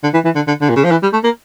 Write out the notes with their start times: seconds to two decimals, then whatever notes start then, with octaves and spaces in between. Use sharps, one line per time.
0.03 D3
0.14 E3
0.25 E3
0.35 D3
0.47 D3
0.61 D3
0.69 A#2
0.76 C#3
0.84 F3
0.91 E3
1.03 G3
1.13 A3
1.24 A#3